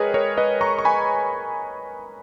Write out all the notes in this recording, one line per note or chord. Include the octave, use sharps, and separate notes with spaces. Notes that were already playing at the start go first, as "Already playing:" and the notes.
Already playing: G#3 G#4 A#4 B4 C#5 D#5 G5
A#4 C#5
B4 D#5
A#5 C#6
C#6
G#5 B5